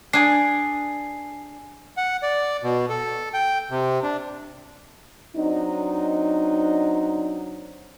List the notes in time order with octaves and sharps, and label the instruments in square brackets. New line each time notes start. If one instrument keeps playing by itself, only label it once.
[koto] D4 G#4 [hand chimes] G#5 C7
[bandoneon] F#5
D5
B2
A4
G5
C3
D4
[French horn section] F#3 C4 D4 D#4